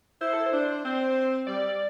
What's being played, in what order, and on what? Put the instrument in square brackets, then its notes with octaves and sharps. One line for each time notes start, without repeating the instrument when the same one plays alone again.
[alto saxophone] E4 [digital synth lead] C5
[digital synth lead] A4
C5
[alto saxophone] D4
[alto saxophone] C4 [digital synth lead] C5
[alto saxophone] G3 [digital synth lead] D5